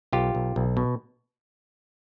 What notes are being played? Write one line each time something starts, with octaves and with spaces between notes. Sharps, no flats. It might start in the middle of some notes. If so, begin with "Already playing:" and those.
B1 F4 G4
B1
B1
B2